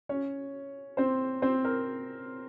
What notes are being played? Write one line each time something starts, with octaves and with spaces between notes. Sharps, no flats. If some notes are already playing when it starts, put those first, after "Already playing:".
C#4 C#5
C4 C5
C4 C5
A#4